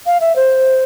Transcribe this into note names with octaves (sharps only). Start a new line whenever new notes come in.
F5
E5
C5